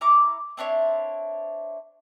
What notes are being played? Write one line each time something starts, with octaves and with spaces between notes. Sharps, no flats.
E4 A#5 C#6 D6
C4 D4 E4 C#5